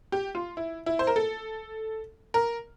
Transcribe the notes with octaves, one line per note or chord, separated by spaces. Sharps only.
G4
F4
E4
E4
C5
A#4
A4
A#4